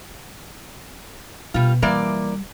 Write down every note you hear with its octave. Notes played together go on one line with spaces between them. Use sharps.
B2 G3 F4
E3 G3 A#3 D5